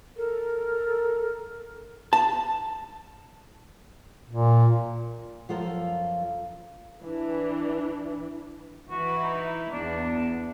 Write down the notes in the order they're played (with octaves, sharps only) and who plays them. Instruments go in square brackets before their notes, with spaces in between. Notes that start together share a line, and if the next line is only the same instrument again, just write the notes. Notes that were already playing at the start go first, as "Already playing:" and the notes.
[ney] A4 [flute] A#4
[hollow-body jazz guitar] A5
[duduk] A#2
[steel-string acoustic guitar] F#2 F3 F4 A4 F5 A#5
[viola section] E3 D4
[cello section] E3 E4 B4 [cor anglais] F#4
[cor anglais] D#4
[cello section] E2 B3 [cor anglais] D4